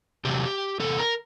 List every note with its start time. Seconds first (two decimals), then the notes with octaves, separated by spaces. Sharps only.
0.25 E2 C3 F#3 G4
0.80 E2 C3 A4
0.98 A#4